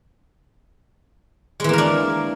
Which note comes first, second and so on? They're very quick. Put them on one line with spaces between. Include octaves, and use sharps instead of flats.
G#3 E3 A#3 A#4 D4